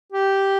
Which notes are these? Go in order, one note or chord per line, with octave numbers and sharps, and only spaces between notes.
G4